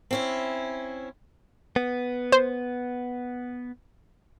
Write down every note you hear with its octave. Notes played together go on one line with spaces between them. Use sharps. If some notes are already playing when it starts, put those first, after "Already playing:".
C4 C#4 E4
B3
C5